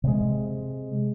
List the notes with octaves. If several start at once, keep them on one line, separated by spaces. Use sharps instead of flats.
C3 G#3